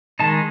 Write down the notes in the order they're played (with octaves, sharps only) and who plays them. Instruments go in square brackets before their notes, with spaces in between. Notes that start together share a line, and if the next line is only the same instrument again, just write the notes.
[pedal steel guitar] D#3 G#3 D#4 A5